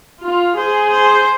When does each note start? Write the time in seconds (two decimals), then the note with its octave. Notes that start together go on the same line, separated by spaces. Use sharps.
0.24 F4
0.57 G#4 C5
0.91 C5